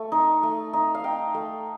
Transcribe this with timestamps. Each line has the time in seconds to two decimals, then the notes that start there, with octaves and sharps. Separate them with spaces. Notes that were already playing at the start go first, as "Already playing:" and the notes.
Already playing: A3
0.12 D#4
0.43 A3
0.73 D#4
0.95 F5
1.04 D#4 G5
1.34 A3